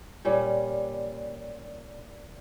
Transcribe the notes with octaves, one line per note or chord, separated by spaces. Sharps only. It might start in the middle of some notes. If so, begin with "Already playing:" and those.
A#2 G3 C#4